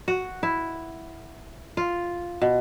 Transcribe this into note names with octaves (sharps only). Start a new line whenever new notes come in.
F#4
E4
F4
B2